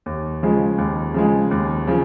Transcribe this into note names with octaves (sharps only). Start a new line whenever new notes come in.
D#2
C#3 F3 G#3
D#2
C#3 F3 G#3
D#2
C#3 F3